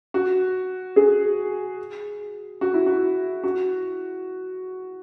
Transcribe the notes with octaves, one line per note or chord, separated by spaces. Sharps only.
F#4
G#4
F#4
E4
F#4
F#4